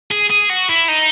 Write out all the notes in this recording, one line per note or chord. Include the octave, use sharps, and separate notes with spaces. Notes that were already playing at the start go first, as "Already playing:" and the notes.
G#4
G#4
F#4
E4
D#4